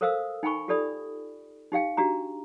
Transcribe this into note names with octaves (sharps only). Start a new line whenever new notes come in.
A4 A#4 C5 F5 D#6 E6
D#4 G5 G#5 B5 C#6
F4 G4 A4 D5 B5 D#6
D#4 G4 F5 G5
D4 F#4 G4 A#5